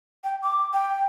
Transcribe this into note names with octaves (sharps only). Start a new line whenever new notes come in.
G5
D6
G5